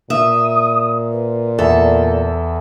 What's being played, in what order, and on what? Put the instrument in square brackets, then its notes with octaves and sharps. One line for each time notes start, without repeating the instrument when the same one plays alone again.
[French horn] A#2 [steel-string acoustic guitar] E5 [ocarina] D#6
[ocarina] B4
[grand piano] E2 E5 [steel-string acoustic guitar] A4 [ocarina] D5